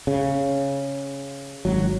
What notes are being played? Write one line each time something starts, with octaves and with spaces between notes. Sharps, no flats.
C#3
G#1 F#3